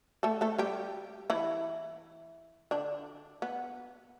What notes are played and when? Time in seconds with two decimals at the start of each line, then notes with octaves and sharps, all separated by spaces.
0.23 A3 A4
0.41 A3 A4
0.58 G3 G4
1.30 E3 E4
2.71 D3 D4
3.42 B3